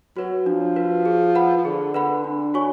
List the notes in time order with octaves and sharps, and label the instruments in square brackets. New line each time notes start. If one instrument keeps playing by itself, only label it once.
[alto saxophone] F#3 [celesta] F#4 B4
[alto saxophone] F3 [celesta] D4
[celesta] F#4 B4
G#4
B4 F#5 B5
[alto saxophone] F3
[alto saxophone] D3 [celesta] G#4
[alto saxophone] D3 [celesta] B4 F#5 B5
[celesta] D4
F#4 C#5 G#5 C#6